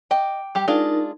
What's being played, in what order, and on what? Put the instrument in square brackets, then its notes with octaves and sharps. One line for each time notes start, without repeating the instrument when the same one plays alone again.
[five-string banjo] D#5 [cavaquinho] G5 D6
[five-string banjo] G3 G4
[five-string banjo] G#3 D4 F4 [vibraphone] D#4 A#4